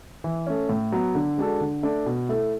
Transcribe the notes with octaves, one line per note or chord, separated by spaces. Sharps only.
E3
A3 C#4
A2
F#3 B3
D3
G#3 D4 F#4 A4
D3
A3 D4
B2
A3 E4 A4